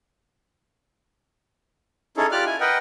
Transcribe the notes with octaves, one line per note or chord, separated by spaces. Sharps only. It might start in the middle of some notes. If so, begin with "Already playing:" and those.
C#4 D#4 E4 G#4 A4 C#5
F4 G4 D5 D6 F6 F#6
E4 G#5
A#4 B4 D#5 F#5 G5